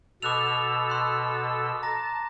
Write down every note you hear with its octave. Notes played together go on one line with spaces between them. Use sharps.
B2 A4 D6 E6 F#6 F7
C6 F#6
A5 A#5 A#6